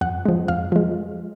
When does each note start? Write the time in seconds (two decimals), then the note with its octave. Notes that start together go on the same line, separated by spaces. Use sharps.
0.01 F2 F#5
0.25 F3 G#3
0.48 F2 F5
0.72 F3 G#3